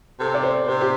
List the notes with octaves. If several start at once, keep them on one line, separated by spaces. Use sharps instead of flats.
C3 A4
D5
C5
C3 C5
G4